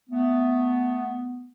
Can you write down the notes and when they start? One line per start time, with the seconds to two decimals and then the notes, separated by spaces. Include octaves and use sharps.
0.10 A3 B3